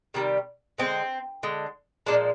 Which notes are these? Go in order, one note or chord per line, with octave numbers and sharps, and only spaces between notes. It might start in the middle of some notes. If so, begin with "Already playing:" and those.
C3 D#3 G3
D3 G#3 C4
D3 G#3
A#2 F3 G#3 D4